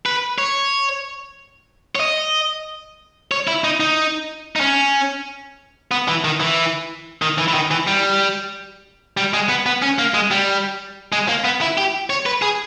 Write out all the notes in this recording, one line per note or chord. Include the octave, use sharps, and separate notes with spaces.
B4
C#5
C#5
D#5
C#5
E4
D#4
D#4
D#4
C#4
B3
E3
D#3
E3
D#3
E3
E3
D#3
E3
G3
G3
G#3
B3
B3
C#4
A#3
G#3
G3
G#3
A#3
B3
E4
G4
C#5
B4
G#4